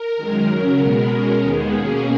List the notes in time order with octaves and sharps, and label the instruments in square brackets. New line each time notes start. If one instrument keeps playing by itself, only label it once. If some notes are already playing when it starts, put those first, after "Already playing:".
Already playing: [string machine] A#4
F#2 D#3 G#3
C#3 F#3 C#4 A#4
B2 G#3 B3
B2 G#3 C#4
D#2 D#3 G#3 B3 G#4
B2 A#3 C#4 G#4